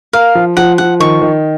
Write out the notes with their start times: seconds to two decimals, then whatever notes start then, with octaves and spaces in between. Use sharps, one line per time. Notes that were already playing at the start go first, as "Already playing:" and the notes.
0.13 A#4 F5
0.35 F3
0.57 F3 F#5
0.78 F3 F#5
1.00 D#3 C#6
1.22 D#3